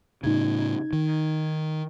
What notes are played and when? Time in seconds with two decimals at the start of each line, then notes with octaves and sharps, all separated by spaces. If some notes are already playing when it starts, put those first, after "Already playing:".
0.23 A2 C#3 D#4 G#6
0.93 D#3